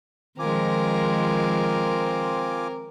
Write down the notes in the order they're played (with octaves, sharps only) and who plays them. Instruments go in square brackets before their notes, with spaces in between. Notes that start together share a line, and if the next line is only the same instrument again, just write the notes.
[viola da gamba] D#3 F3 G#3 [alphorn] C4 [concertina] F4 G#5 D6 [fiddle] A#4